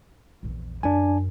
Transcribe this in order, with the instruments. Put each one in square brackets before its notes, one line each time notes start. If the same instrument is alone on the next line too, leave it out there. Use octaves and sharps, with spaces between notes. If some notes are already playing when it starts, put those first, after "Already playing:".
[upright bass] A#1 E2
[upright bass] F#2 [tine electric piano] D4 G#5